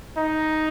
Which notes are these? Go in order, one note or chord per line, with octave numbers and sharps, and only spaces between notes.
D#4